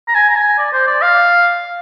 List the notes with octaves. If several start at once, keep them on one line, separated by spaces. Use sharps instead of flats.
A#5
G#5
A#5
G#5
D5
C5
D5
F5